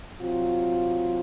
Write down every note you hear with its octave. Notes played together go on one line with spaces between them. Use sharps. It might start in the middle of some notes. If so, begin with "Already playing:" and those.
C3 F#3 C4 F4